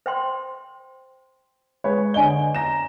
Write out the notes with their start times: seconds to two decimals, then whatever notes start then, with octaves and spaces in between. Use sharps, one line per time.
0.06 C5 G5 C6
1.84 G#3 B4 C#5
2.14 D3 D5 D#5 G#5 G7
2.55 A#5 A#6 E7